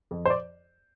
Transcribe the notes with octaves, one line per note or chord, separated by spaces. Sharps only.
F2
C5
D5